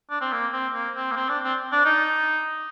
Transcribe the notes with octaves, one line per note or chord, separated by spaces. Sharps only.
D4
C4
A#3
C4
A#3
C4
A#3
C4
D4
C4
D4
D#4